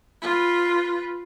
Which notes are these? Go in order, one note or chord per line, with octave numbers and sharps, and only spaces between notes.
F4 B4